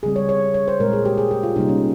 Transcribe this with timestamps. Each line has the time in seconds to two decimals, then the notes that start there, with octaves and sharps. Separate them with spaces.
0.03 C#3 G3 C4 G#4
0.16 C#5
0.29 C#5
0.54 C#5
0.68 C5
0.80 A#2 G#3 C4 A#4
0.93 G#4
1.05 G4
1.18 G#4
1.31 G4
1.43 F4
1.56 C3 G3 A#3 D#4
1.69 C#4